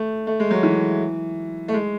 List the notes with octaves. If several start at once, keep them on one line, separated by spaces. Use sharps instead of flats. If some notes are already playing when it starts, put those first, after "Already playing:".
Already playing: A3
A3
G#3
F#3
E3
A3
G#3